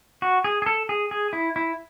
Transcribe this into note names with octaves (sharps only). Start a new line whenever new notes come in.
F#4
G#4
G#4
A4
G#4
G#4
E4
E4